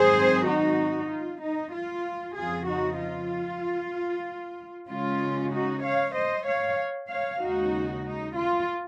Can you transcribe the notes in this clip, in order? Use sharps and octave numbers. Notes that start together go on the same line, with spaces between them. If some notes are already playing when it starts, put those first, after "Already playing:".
Already playing: G#2 D#3 F#3 C4 G#4 C5
D#4 F#4
F4
D#4
F4
F2 C#3 F3 C4 F4 G#4
D#4 F#4
F4
C#3 G#3 C#4 F4
D#4 F#4
C#5 F5
C5 D#5
C#5 F5
C#5 F5
D#2 C#3 G#3 D#4 F#4
D#4
F4